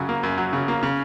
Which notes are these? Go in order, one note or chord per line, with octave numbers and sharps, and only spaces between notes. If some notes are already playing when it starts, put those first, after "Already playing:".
Already playing: F#2 C#3 F#3
A#3
F#2
F#3
C#3
A#3
C#3